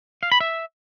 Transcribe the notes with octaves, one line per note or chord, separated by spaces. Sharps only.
F5
B5
E5